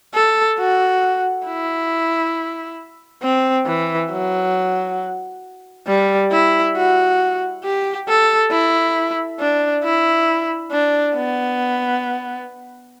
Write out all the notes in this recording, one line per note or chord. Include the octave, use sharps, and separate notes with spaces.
A4
F#4
E4
C4
E3
F#3
G3
E4
F#4
G4
A4
E4
D4
E4
D4
B3